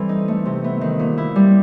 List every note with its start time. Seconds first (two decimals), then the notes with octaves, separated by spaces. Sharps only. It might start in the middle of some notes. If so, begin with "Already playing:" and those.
Already playing: E3 G3 C4 A4
0.09 D#4
0.28 A3
0.46 C3
0.64 B3
0.81 D#3
0.99 A#2
1.18 E4
1.36 G3